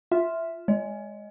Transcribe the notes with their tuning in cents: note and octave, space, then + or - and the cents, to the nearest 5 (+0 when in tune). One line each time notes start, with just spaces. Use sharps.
F4 -5 E5 +0
G#3 +0 C#5 +40